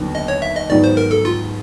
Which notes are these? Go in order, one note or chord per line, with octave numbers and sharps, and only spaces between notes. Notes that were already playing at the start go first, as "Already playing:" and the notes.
Already playing: D#2 D3 F#3 B3
D#5
C#5
E5
D#5
G#2 D#3 F#3 B3 D5
C5
A#4
A4
F4